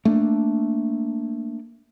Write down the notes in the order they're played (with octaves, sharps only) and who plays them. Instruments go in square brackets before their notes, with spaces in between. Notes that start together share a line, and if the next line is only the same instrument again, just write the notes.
[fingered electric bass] A3 A#3 D4